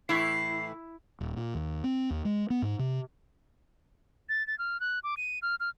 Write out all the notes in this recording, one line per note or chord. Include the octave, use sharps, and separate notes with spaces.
A2 E3 E4 C7
D#1
A#2
D#2
C4
D#2
G#3
B3
G#2
C3
A6
A6
F6
F#6
D6
D#7
F6
F6